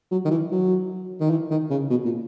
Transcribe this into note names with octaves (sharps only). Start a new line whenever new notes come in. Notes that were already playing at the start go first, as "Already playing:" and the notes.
F#3
D#3
E3
F#3
D#3
E3
D#3
C#3
B2
A#2